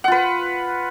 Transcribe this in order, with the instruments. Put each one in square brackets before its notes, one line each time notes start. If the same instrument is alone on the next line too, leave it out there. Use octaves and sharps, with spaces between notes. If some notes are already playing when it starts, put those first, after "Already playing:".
[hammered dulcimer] F#5
F4
B4